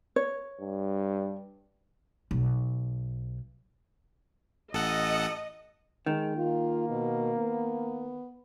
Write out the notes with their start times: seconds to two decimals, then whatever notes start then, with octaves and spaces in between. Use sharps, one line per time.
0.16 C#5
0.61 G2
2.31 B1
4.73 A1 A4 D#5 F#5
6.06 D#3 G#3
6.37 A#3 F4
6.89 B2
7.37 B3